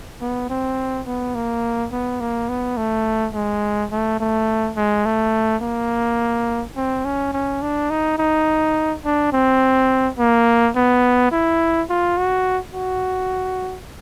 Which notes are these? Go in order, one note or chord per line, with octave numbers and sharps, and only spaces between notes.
B3
C4
B3
A#3
B3
A#3
B3
A3
G#3
A3
A3
G#3
A3
A#3
C4
C#4
C#4
D4
D#4
D#4
D4
C4
A#3
B3
E4
F4
F#4
F#4